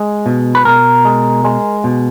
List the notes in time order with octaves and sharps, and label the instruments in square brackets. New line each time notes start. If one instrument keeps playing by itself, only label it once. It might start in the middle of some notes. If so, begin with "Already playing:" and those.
Already playing: [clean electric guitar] G#3
B2
B4
B2 A#4
G#3
G#3
B2